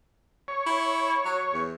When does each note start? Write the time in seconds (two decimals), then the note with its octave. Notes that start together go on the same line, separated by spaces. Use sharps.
0.48 C#5
0.67 E4
1.25 F#3
1.53 E2